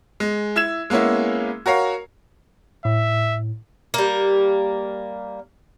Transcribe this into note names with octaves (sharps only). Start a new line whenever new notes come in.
G#3
E4 E6 G#6 E7
G#3 A#3 B3 C#4 E4
F#4 A#4 C#5 F5
A2 E5
G3 A#3